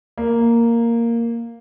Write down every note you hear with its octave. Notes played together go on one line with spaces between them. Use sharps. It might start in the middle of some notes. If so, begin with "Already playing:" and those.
A#3